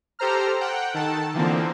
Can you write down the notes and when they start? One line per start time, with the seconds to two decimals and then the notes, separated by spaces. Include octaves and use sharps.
0.19 G4 A4 C5 A#5 F6
0.60 F#5 G5
0.94 D#3 A4 A5
1.34 D3 E3 F3 A#3 C4